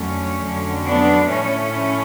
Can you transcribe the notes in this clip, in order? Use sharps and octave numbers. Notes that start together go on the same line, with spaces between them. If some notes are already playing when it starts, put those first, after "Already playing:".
Already playing: F2 D3 F#3 A3 C#4
F2 D3 F#3
B3 D4
A2 F3 A3 C#4